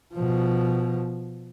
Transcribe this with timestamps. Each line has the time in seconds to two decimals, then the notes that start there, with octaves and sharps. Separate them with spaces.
0.14 B2 F3